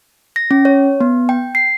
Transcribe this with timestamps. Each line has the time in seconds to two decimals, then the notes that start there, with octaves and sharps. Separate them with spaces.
0.36 A#6
0.51 C#4
0.65 C#5
1.00 B3
1.29 G5
1.55 C7